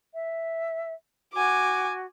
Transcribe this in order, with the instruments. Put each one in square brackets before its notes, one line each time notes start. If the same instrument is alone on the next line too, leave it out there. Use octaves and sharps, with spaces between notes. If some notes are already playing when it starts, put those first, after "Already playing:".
[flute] E5
[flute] F#4 [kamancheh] G#5 D6